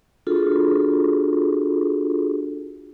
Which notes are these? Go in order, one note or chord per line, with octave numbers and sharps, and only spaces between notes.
D4 F4 F#4 G#4 A4